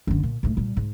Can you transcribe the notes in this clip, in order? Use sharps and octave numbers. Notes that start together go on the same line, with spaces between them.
F#1 D3
A#2
G#2 A3
A#2 G3
G#2